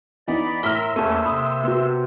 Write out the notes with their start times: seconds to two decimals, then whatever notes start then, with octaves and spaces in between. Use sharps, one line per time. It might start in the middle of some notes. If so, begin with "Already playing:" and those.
0.28 E3 B3 D#4 D5 B5
0.63 A2 A#4 E5 C6 E6 F6 B6
0.96 E2 A3 A#3 C#4 A4 A5 D#7
1.26 C3 B5 D#6
1.64 B3 F#4